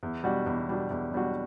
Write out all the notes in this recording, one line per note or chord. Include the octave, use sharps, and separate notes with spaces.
E2
B2 G3 D4 F#4
E2
B2 G3 D4 F#4
E2
B2 G3 D4 F#4